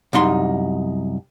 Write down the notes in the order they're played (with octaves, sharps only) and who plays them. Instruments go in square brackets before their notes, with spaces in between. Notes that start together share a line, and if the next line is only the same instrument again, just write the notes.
[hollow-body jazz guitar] C2 F#2 D#4 C6